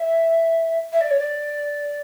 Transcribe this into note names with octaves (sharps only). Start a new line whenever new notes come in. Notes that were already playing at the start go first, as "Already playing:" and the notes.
Already playing: E5
E5
D5
C#5
D5